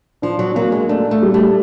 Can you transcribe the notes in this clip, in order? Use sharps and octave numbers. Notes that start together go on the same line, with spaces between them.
F3 D4
F#3
F#3 A#3
G#3
A3 D4
A3
G3
A3